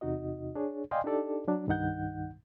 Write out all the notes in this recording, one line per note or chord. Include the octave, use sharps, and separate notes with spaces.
E2 C3 D#4 F#4 D#5
D4 G#4 C#5
D5 D#5 F5 G5 G#5 C6
D4 D#4 G4 A4 D5
F#3 D4
C2 G2 D#3 D#4 F#5 G6